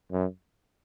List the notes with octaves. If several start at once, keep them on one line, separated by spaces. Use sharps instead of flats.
F#2